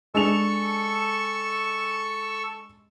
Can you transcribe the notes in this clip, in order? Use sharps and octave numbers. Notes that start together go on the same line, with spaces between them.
G#3 D4 A4 C#6 E6 F7